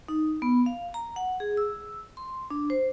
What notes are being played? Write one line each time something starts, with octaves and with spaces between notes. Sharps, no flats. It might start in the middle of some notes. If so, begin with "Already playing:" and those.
D#4
B3
F5
A#5
F#5
G#4
E6
C6
D4
C5